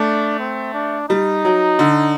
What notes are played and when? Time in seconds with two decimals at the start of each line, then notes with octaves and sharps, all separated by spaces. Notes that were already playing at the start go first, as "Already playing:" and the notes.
Already playing: A3 D4
0.39 C4
0.74 D4
1.09 G3 D#4
1.45 F#3
1.79 D3